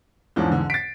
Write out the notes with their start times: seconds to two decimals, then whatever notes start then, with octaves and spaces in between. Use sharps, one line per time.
0.36 E2 G#2 F3 C#4 D4
0.51 D3
0.70 A6 B6 C7 D7